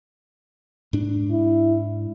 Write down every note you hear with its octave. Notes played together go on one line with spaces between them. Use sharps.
G#2 D4
E4